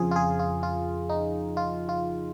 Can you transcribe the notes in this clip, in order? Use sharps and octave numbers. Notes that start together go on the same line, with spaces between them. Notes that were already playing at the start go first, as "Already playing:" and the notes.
Already playing: F2 C#3 F3 F4 G#4
F4
G#4
F4
F4
D#4
F4
F4